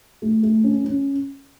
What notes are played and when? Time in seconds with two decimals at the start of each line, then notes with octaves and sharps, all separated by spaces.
0.22 A3
0.43 A3
0.64 C#4
0.84 C#4